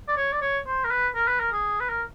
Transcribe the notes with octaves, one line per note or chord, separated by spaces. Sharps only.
D5
C#5
D5
C#5
C5
A#4
B4
A#4
B4
A#4
G#4
B4
A#4